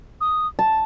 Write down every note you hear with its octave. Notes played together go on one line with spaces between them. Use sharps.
D#6
A5